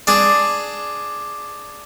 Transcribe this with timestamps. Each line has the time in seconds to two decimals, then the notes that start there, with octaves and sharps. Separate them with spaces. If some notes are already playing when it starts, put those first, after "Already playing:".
0.07 D4 G#4